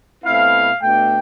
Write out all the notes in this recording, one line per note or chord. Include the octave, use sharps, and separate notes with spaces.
B2 A3 C4 E4 F5
B2 A3 D4 G5